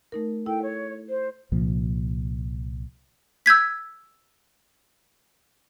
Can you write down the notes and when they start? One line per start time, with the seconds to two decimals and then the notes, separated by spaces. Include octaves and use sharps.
0.12 A3 D#4 A#4
0.46 E4 A4 G5
0.62 C#5
1.09 C5
1.52 C2 A#2 F3
3.46 E6 G6 G#6 B6